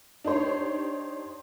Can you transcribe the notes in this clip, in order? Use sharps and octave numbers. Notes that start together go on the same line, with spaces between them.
D4 D#4 G4 C5 C#5